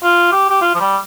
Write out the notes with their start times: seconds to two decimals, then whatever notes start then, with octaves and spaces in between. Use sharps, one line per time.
0.03 F4
0.32 G4
0.50 G4
0.61 F4
0.75 F3
0.80 G3